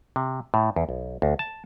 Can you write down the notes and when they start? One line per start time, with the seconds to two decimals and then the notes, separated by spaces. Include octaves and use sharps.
0.16 C3
0.54 A2
0.76 E2
0.89 B1
1.22 D2
1.39 A5